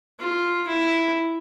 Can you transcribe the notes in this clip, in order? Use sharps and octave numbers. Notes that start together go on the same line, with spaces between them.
F4
E4